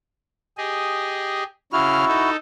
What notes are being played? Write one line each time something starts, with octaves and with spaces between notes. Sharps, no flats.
G4 G#4 D#5
C#3 E4 F#4 F6
D#4 A4